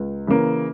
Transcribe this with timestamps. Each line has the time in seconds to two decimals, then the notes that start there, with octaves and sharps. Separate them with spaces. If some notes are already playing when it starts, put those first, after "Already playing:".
Already playing: C#2
0.27 C#3 E3 A#3